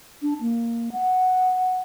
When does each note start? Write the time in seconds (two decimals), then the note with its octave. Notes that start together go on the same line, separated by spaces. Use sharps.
0.22 D4
0.41 A#3
0.92 F#5